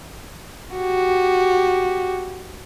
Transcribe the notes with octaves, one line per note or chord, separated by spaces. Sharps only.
F#4 G4